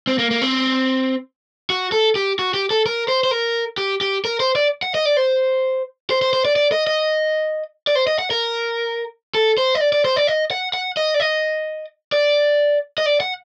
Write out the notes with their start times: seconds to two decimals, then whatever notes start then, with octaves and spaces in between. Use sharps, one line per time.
0.07 C4
0.19 A#3
0.31 A#3
0.42 C4
1.70 F#4
1.92 A4
2.16 G4
2.39 F#4
2.54 G4
2.71 A4
2.86 A#4
3.08 C5
3.24 C5
3.31 A#4
3.78 G4
4.01 G4
4.25 A#4
4.40 C5
4.55 D5
4.83 F#5
4.95 D#5
5.05 D5
5.17 C5
6.10 C5
6.22 C5
6.33 C5
6.45 D5
6.56 D5
6.72 D#5
6.87 D#5
7.87 D5
7.95 C5
8.07 D#5
8.19 F#5
8.31 A#4
9.35 A4
9.58 C5
9.75 D#5
9.81 D5
9.93 D5
10.05 C5
10.16 D5
10.27 D#5
10.51 F#5
10.74 F#5
10.97 D#5
11.14 D5
11.20 D#5
12.12 D5
12.98 D#5
13.06 D5
13.20 F#5